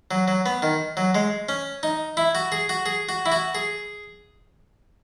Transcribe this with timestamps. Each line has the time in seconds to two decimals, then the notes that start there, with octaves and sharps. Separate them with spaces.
0.11 F#3
0.28 F#3
0.46 B3
0.62 D#3
0.97 F#3
1.15 G#3
1.49 C#4
1.83 D#4
2.17 E4
2.35 F#4
2.52 G#4
2.69 F#4
2.86 G#4
3.09 F#4
3.26 E4
3.32 F#4
3.55 G#4